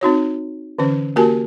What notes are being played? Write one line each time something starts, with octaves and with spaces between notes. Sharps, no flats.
C4 D#4 F#4 C#5
D3 E3 C#4 C5
A#3 F#4 G4 A#4 G#5 A5